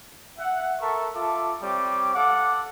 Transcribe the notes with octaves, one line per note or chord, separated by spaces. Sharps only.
E5 F#5
A4 A#4 E5 A5 C#6
F4 A4 E5 A5 D6
G3 C4 C#5 D6
A4 F5 F#5 D6